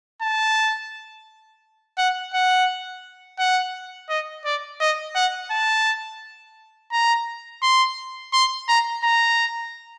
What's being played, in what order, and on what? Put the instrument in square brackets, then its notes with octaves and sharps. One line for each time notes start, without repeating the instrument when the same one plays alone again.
[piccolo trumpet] A5
F#5
F#5
F#5
D#5
D5
D#5
F#5
A5
A#5
C6
C6
A#5
A#5